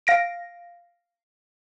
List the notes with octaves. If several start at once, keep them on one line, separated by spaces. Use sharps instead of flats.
F5 A#6 D7